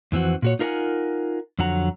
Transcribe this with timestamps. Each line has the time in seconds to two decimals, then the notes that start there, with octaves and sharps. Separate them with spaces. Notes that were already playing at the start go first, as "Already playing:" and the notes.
0.12 F2 E3 C4 F#4
0.42 A#2 F#4 C#5
0.59 D#4 F4 A#4 C#5 F#5 G#5
1.59 F2 D3 F#3 F#5 A#5